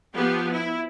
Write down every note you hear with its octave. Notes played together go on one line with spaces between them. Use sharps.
F3 B3 G4
E4